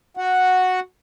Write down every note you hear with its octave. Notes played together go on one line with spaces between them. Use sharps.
F#4 F#5